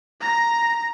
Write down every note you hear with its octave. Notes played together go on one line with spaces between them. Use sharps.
A#5 A#6